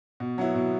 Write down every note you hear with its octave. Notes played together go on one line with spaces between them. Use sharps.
B2
F#3 B3 E4
B2